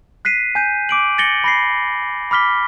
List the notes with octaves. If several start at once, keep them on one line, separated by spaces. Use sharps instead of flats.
F#6 B6 C7 D#7
G#5 G6 D#7
D6 D7 F#7
A6 A#6 C#7 F#7 G7
B5 A#6 C7
B5 D6 F6 B6 G7